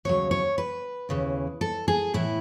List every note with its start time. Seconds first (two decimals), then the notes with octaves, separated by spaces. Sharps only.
0.05 D#2 C#3 F#3 C#5
0.31 C#5
0.58 B4
1.09 D#2 C#3 E3
1.61 A4
1.88 G#4
2.14 A2 E3 E4